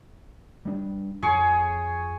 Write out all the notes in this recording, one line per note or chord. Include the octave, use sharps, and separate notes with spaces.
G3 D4
F2 G#4 C#5